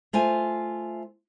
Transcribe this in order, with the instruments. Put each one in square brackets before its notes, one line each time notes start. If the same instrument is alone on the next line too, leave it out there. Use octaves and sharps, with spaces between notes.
[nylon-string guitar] A3 F4 C5 G#5